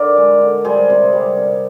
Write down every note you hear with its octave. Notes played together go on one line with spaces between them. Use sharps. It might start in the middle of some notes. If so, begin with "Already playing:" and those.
Already playing: D3 A#4 D5
G#3
D3
G3 G#4 C5
C3
G3
C3